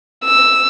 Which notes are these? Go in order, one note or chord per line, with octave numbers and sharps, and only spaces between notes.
E6